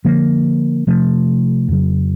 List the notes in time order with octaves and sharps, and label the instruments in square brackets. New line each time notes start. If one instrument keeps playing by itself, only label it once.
[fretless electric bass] D3 F3 A#3
C3 F3 A3
F2 C#3 F#3